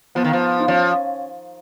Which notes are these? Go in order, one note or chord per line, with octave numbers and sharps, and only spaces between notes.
F3 B3
D#3
F3
D#4
F3 C#4